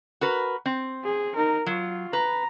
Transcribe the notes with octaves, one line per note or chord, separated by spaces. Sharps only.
F#4 A#4 B4
C4
G#4
D#4 A#4
F#3 F4
B4 A#5